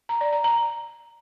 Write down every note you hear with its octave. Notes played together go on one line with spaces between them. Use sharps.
A#5
D5
A#5
A#5